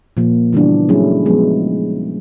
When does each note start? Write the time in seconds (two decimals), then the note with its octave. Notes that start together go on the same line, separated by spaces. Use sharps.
0.17 A#2 F3 A#3
0.53 C#3 E3 G3 B3 D4
0.89 F#3 A3 C#4 E4 G#4
1.26 F3 G#3 B3